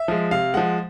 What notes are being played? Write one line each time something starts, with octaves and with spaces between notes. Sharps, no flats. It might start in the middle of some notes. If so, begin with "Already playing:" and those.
Already playing: E5
F3 G#3
C3 F5
F3 G#3 F#5